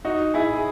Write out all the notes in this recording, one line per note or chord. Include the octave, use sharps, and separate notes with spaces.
D#4 F#4
E4 G#4
G#4